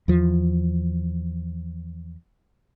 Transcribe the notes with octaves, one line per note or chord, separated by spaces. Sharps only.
E2 F3